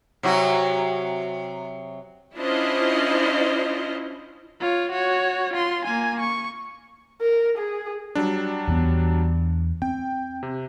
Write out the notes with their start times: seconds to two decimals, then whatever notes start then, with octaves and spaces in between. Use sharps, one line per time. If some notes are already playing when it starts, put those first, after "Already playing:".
0.23 C3 F#3 F#4
2.36 C#4 D4 E4 F4 C5 D#5
4.60 F4 C#5
4.92 F#4 C#5
5.53 F4 C6
5.85 A#3 G#5
6.20 C#6
7.21 A#4
7.57 G#4
8.15 F#3 G3 D4
8.67 E2 E3 B3
9.82 C4 G5
10.43 C3